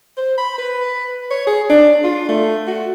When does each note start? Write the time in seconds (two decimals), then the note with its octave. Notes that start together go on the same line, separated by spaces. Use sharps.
0.17 C5
0.38 B5
0.58 B4
1.31 C#5
1.47 G#4
1.70 D4
2.04 F4
2.29 A3
2.67 F#4